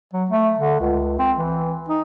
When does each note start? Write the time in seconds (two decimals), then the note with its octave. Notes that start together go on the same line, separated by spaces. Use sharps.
0.13 F#3
0.29 A3
0.58 D3
0.80 C#2
1.19 C4
1.38 E3
1.88 D#4